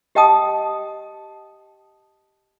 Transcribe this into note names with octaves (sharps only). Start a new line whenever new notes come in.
G4 D#5 G5 A5 D#6